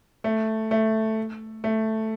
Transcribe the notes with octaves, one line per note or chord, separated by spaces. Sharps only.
A3
A3
A3